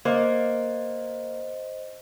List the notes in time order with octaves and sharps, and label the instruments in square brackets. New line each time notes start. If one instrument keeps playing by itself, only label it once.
[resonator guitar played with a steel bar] A#3 [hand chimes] C5 D#5